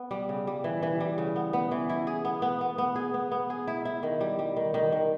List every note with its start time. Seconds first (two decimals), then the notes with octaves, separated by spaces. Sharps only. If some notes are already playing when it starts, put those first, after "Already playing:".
Already playing: B3
0.11 G3
0.29 C#3
0.47 G3
0.64 E3
0.83 E3
1.00 G3
1.18 C#3
1.36 B3
1.53 B3
1.71 E3
1.89 E4
2.07 G#4
2.25 B3
2.42 B3
2.61 B3
2.78 B3
2.96 G#4
3.14 B3
3.32 B3
3.50 G#4
3.67 E4
3.85 E4
4.03 D#3
4.21 G3
4.39 G3
4.56 D#3
4.74 D#3
4.92 D#3